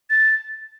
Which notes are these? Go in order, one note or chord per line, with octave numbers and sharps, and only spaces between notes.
A6